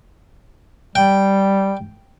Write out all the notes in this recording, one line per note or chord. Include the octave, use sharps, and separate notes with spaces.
G3 G5